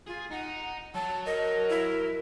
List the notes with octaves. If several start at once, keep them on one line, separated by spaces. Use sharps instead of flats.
F4 G#4
D#4 F#5
F#3 A5
A#4 D#5
E4